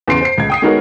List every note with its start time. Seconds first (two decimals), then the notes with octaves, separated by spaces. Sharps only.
0.08 E2 C#3 C6 C7 D7
0.21 C5 C7
0.38 C#2 G#6
0.50 G5 D#6 C7
0.62 G#3 B3 D#4 F#4 A#4 C#5